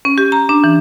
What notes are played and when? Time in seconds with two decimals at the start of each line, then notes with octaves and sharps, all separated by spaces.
0.05 C#4
0.18 G4
0.32 A#5
0.49 D4
0.64 E3